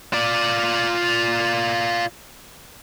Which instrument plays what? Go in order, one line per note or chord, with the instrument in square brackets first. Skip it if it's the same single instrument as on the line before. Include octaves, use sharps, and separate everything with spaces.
[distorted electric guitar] F4 D5